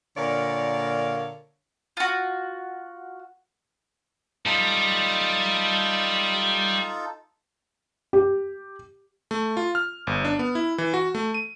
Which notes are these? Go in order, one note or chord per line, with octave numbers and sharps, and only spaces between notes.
A#2 D3 A#4 C#5 D5 F5
F4 F#4
G3 D#4 F4 A4
G4
A3
F4
F6
G1
D4
B3
E4
E3
F#4
A3
D#7